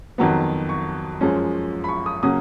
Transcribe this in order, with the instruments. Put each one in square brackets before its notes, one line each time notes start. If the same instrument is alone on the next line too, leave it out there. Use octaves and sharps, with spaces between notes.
[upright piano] F2 D#3 F#3 B3
C#6
F#2 F3 G#3 C#4
B5
C#6
D#6
C#3 F#3 A#3 C#4 D#6